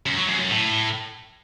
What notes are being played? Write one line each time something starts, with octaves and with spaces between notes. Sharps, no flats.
F#2
F#3
F#2
F#2
A2